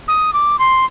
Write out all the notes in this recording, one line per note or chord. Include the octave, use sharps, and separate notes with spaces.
D#6
D6
C6